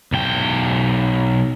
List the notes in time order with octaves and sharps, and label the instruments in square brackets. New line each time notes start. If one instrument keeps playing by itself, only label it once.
[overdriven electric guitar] B1 G5